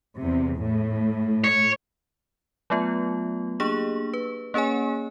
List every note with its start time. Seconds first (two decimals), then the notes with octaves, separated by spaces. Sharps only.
0.19 E2 C3
0.58 A2
1.44 C#5
2.70 F#3 A3 B3 F4
3.60 A#3 D4 G4 G#4 C#6
4.14 B4
4.54 A#3 C#4 G#4 C#5 G#5